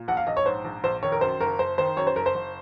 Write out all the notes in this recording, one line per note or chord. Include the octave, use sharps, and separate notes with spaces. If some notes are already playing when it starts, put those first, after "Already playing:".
Already playing: A#2
A#1 F#5
F5
A#1 D#5
C#5
G#2 C5
A#1
A#1 C5
D#3 C#5
A#4
F#2 C5
F#1 A#4
F#1 C5
D#3 C5
F#2 C#5
C5
F#1 A#4
C5
F#1